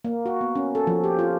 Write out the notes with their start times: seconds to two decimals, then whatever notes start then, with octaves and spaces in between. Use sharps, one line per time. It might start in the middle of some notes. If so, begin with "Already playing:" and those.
0.05 A#3
0.26 F#4
0.41 B3
0.56 C#4
0.75 A4
0.87 F3
1.04 G4
1.19 F4